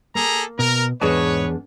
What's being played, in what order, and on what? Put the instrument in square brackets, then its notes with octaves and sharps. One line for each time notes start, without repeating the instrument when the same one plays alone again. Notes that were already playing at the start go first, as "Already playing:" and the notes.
[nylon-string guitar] A#3 [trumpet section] G#4 A4 A#5
[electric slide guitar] B2 [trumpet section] A#4
[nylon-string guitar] E2 D4 G#4 [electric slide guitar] G#2 D#5 A5 [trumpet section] B4 C#5